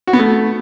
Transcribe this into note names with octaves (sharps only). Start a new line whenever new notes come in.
F#4
B3
A3